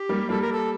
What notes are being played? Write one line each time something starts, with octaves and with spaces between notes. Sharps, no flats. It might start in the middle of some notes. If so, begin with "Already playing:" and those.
Already playing: G4
G3 A#3
G3 A#3 A4
A#4
A4